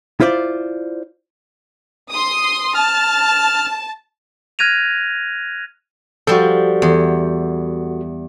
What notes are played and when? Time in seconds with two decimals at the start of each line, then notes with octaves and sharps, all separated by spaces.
0.20 E4 F4 C5 D5
2.12 C6 D#6
2.75 A5 F6
4.59 F6 F#6 G#6 A#6 D#7 F7
6.27 F3 G3 F#4 A4
6.82 E2